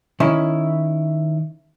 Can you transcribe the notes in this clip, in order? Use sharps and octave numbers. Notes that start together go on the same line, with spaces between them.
D#3 C#4 E4